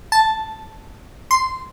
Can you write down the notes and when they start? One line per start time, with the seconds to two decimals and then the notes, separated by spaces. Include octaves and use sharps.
0.12 A5
1.31 C6